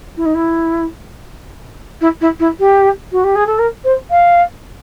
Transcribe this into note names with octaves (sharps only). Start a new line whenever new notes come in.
E4
D#4
E4
E4
E4
E4
G4
F#4
G4
G#4
A4
A#4
C5
F5